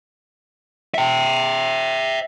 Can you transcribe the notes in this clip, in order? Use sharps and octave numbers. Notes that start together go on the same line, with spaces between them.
E5 G5